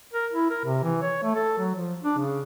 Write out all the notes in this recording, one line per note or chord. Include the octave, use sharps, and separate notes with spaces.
A#4
E4
A#4
C3
E3
C#5
A3
A4
F#3
F3
D4
C#3